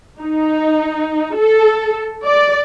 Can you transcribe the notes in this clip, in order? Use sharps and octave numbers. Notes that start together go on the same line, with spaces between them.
D#4
A4
D5